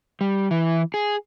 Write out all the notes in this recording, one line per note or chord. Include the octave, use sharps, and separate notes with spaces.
G3
E3
G#4